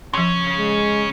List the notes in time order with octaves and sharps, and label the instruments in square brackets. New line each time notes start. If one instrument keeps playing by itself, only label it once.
[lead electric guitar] C#3 C#4 [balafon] F3 C6
[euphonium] G#3